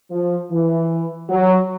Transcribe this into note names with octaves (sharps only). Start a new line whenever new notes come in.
F3
E3
F#3